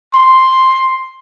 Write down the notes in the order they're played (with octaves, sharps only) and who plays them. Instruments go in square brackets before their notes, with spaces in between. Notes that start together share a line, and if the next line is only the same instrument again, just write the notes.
[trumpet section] C6